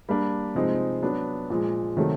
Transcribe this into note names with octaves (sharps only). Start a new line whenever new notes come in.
G3 A#3 D4
C3 F3 G#3 C4 D#4
F#3 B3 D4
A#2 F3 G#3
C3 D#3 F#3 A3